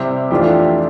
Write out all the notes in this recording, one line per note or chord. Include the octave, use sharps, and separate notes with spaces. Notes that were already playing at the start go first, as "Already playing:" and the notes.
Already playing: C3 G3 C4 E4
F2 E3 A3 D4 F4 G4